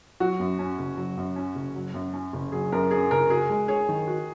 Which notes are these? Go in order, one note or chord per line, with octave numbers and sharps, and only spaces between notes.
F#3 F#4
F#2
C#4
F#1
F#3
F#2
C#4
F#1
F#3
F#2
C#4
F#1
F#3 G#4
F#2 A#4
C#4 G#4
F#1 A#4
F#4 G#4
G#3
G#4 C#5
D#3
F#4